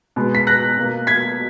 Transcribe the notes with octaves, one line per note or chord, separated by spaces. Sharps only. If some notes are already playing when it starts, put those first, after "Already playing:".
B2 G#3 B3
B6
F#6 A#6
B2 A#3
G#6 B6